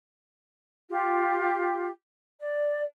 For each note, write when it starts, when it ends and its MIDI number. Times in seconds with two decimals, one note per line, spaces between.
0.89 1.88 65
0.89 1.88 67
2.39 2.83 74